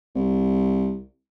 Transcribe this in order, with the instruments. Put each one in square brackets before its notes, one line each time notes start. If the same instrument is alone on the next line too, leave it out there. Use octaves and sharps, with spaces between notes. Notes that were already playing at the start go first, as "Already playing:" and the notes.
[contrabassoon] C2